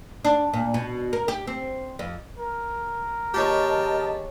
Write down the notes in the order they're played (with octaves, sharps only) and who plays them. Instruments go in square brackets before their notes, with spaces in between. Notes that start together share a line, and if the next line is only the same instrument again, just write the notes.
[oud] D4
A#2
B2
A#4
G4
C4
F2
[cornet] A#4
[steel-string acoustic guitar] D#2 G#4 C#5 [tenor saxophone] G4 [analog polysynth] D#5 A5